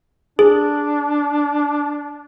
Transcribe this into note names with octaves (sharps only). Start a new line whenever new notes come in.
D4 G#4